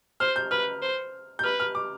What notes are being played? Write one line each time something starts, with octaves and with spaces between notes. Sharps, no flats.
C5 F6
G6
B4 F6
C5
G6
B4 F6
F6
D6